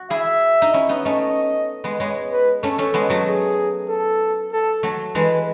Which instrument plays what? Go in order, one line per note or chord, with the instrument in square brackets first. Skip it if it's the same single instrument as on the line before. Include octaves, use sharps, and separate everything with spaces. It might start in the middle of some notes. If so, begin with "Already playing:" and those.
Already playing: [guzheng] F#4
[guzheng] E4 G#4 [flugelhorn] E5
[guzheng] D#4
C#4 E4
B3 D#4
[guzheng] A3 C#4 [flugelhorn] D#5
[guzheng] G#3 B3
[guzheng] G#3 B3 [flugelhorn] C#5
[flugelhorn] B4
[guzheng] A3 C#4 [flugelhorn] A4
[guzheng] A3 C#4
G#3 B3
F#3 A3
[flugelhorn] G#4
A4
A4
[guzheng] F#3 A3
[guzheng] E3 G#3 [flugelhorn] B4